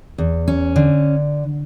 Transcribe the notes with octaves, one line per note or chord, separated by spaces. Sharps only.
E2
C#4
D3